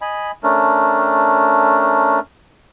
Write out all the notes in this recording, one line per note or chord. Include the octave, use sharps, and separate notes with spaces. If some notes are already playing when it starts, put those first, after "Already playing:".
D#5 G#5 B5
A3 C#4 D4 A#4